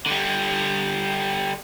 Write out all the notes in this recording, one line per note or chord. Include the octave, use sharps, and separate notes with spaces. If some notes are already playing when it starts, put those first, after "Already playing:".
D3 G3